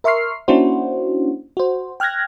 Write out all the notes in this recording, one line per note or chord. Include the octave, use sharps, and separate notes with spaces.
A#4 E5 C6 C#6 F6 C7
A#3 C#4 D4 E4 F#4 C5
F#4 C5
G5 F6 F#6 G#6 A#6